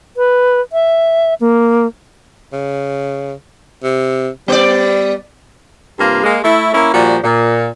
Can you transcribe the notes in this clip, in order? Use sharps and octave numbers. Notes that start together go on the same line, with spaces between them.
B4
E5
A#3
C#3
C3
G3 B3 D5
G2 C3 A#3 F4
G#3 A#3
A3 E4
A#3 C#4 E4
A#2 F3 G3 F#4
A#2